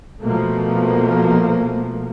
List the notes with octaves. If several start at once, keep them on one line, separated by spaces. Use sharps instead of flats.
B2 F3 A3 A#3